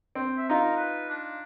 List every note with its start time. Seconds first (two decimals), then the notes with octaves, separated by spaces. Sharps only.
0.15 C4
0.38 E5
0.50 D#4 F4 A#4
0.76 B4
1.09 D4